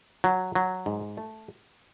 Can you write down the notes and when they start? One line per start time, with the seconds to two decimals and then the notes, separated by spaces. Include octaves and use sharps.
0.24 F#3
0.55 F#3
0.86 G#2
1.17 A3